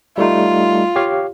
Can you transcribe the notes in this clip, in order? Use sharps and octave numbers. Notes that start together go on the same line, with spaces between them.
G3 A3 D#4 F4
G4 C#5 F5